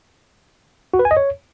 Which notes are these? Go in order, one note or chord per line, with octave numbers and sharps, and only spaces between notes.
F#4
B4
G#5
D#5
C#5